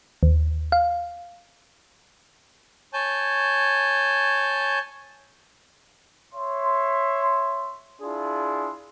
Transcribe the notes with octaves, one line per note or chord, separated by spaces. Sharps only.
D#2
F5
C#5 G#5 A5 G6
C#5 E5 C6
D4 E4 F4 G#4 C6